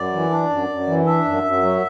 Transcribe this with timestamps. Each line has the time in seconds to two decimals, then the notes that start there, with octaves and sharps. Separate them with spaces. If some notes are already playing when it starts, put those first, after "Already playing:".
Already playing: F#2 D5
0.12 E3
0.31 D4
0.49 F#2
0.69 F#2
0.87 E3
1.06 D4 E5
1.25 F#2
1.44 F#2
1.62 F#3